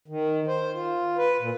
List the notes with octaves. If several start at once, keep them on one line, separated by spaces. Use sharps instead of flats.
D#3
C5
F4
B4
A#2